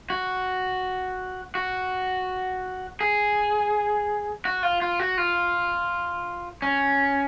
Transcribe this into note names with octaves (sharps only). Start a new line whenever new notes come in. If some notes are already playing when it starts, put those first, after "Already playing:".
F#4
F#4
G#4
F#4
F4
F4
F#4
F4
C#4